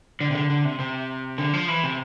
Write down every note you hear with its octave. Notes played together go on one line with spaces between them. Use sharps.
D3
C3
D3
D3
C3
C3
D3
F3
E3
C3